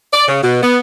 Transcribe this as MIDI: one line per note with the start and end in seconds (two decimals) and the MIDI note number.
0.13 0.28 74
0.28 0.42 49
0.43 0.60 47
0.63 0.79 59